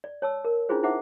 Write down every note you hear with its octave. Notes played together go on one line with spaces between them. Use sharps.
D5
C#5 A5 E6
A#4
C#4 D4 E4 F4 G#4 C5
D#4 E4 C5 E5 F#5 D6